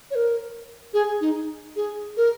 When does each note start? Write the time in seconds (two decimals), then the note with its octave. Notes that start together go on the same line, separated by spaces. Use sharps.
0.11 C#5
0.15 A#4
0.94 G#4
1.21 D#4
1.76 G#4
2.17 A#4